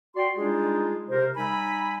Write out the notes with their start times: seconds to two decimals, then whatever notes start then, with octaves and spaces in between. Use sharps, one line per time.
0.16 F#4 D5 G5 C6
0.37 G3 G#3 D4 D#4 F4 G#4
1.10 C3 A#4 C5
1.37 G3 D#4 E5 G#5 B5